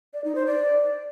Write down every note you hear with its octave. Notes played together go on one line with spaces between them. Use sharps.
D5
D#4
C5
D5